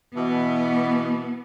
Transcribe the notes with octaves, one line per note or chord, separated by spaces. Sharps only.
B2 E3 B3